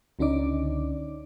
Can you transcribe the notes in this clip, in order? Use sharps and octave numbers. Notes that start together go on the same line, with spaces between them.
C#2 D3 C#4 D#4 D5 D6